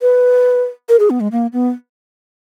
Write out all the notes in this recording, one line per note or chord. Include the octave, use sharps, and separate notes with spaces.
B4
A#4
G#4
B3
G#3
A#3
B3